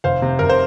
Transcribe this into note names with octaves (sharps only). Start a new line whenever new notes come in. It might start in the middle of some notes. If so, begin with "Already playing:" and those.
F1 C5 F5
C3
F1 A#4
C5